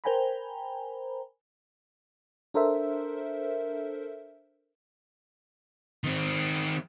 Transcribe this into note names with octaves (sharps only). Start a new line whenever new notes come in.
A#4 C5 G5 G#5 A#5 B5
D4 A4 A#4 C5 E5
D#3 C4